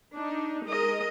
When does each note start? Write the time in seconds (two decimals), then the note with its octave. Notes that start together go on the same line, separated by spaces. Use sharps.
0.13 D4 D#4
0.66 G#3 A#4 D#5